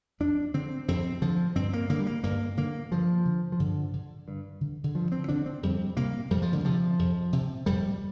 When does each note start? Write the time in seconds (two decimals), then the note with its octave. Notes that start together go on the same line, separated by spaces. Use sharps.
0.20 F2 D4
0.54 D3 C4
0.88 F2 C4
1.22 D3 F3
1.55 G2 C4
1.73 A#3
1.90 D3 A#3
1.99 G3
2.06 A#3
2.23 G2 A#3
2.57 D3 A#3
2.92 G2 F3
3.25 D3
3.52 F3
3.59 G2 D3
3.93 D3
4.28 G2
4.61 D3
4.84 D3
4.95 G2 F3
5.12 C4
5.29 D3 D4
5.46 C4
5.63 F2 G3
5.97 C3 A#3
6.31 F2 G3
6.42 F3
6.53 D3
6.64 C3 F3
6.99 F2
7.33 C3
7.66 F2 G3